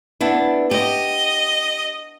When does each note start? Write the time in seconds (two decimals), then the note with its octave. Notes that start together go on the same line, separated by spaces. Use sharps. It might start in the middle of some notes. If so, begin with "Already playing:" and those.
0.21 B3 D4 E4
0.71 G4 D#5